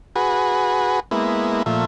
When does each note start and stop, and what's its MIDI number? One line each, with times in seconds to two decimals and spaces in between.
0.16 1.00 66
0.16 1.00 68
0.16 1.00 71
1.11 1.63 56
1.11 1.63 58
1.11 1.63 59
1.11 1.63 64
1.66 1.85 46
1.66 1.85 53
1.66 1.85 57
1.66 1.85 76